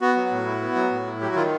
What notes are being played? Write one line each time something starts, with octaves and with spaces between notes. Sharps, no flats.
B3 F#4
F#3
A2
E4
B3
F#3
A2
E4
F#3 G4
F#4
D#3 F4